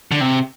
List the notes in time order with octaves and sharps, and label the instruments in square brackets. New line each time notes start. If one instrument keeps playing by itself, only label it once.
[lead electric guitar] D3
C3